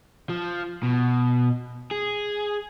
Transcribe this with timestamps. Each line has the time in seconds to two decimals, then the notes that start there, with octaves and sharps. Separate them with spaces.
0.29 F3
0.83 B2
1.91 G#4